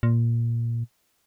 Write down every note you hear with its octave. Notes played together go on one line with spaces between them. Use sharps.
A#2